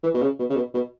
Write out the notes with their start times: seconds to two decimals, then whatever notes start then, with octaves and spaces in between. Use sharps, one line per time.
0.03 E3
0.14 B2
0.22 C#3
0.39 B2
0.50 C#3
0.56 B2
0.74 B2